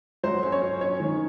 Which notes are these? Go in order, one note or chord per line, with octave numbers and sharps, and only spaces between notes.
F#3 C5
C#4
C#5
C#4
C#4 C#5
D#3